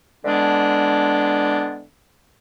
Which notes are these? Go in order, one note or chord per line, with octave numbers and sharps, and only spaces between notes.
D3 E3 G#3 B3 D4